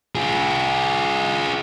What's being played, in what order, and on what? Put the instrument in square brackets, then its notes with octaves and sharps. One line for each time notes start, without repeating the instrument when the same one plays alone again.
[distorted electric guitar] F4 G#4